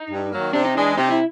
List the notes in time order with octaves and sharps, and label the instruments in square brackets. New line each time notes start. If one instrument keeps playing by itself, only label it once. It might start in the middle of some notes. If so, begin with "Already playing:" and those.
Already playing: [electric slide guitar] D#4
[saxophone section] G2
D#3 F#3 A#3
[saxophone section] C3 [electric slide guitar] D4
[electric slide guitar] D#4
[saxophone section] E3 G#3 [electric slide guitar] D4
[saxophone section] C3 [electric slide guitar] D#4
[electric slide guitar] E4